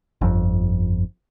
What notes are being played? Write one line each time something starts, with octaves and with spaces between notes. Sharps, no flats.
G1 F2